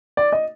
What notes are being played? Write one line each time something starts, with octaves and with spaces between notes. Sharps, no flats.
D5
D#5